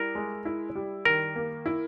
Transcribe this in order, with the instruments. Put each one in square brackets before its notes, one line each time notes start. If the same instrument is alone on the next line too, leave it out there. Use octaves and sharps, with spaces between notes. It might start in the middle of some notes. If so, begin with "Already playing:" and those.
Already playing: [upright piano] G3 E4 [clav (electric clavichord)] A#4
[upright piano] G#3
E4
G3
[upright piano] D#3 [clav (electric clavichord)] A#4
[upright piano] A#3
E4